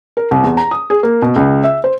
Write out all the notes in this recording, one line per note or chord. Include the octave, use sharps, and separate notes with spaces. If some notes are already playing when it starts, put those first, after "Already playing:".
A#4
C2
E2
A#5
D#6
G#4
A#3
B2
C#2
E5
C5